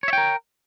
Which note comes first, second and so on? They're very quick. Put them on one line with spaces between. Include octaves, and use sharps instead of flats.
C#5 E5 G5 A#4